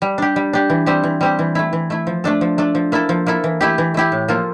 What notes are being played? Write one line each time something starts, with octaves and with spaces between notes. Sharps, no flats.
G3
D4 G4
G3
D4 G4
E3
G3 C4 G4
E3
G3 C4 G4
E3
A3 E4
E3
A3 E4
F3
A3 D4 A4
F3
A3 D4 A4
F3
A#3 E4 A4
F3
A#3 E4 A4
E3
A3 E4 G4
E3
A3 E4 G4
A2
F3 A#3 F4 A4